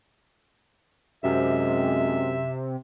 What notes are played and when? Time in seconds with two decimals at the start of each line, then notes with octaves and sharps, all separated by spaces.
1.24 F#2 C3 G#3 E5